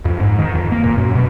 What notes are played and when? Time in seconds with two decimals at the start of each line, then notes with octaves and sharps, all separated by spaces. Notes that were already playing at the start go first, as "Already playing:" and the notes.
0.05 F2
0.20 G#2
0.39 D#3
0.54 F2
0.71 A#3
0.84 A#2
0.98 F#2
1.15 B2